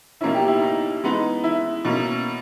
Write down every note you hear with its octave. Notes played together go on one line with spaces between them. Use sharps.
B2 A#3 C#4 E4
G4
E4
D#4
E3 G#3 B3 D#4
E4
B2 A#3 C#4